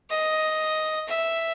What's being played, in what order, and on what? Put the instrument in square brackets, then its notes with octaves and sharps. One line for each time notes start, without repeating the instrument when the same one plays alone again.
[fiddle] D#5
E5